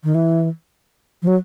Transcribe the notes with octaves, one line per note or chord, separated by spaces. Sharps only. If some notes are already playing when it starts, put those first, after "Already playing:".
D#3
E3
F3
F#3